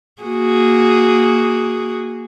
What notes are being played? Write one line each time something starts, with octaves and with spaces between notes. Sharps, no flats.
A#3 F#4 G#4